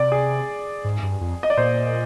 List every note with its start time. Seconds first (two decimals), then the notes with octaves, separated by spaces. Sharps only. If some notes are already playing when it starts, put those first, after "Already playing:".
Already playing: C3 D5
0.12 G#4
0.85 G#2
1.03 G2
1.21 F2
1.43 D#5
1.50 D5
1.57 A#2 C5